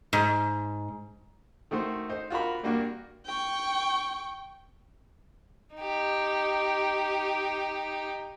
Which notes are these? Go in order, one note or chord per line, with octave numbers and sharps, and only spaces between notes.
G#2
D#3 A3 F#4 C5 C6
D#4 C5
F4 F#4 A#4 B5
G2 G3 A#3 D4 F#4
G5 C#6
D#4 G4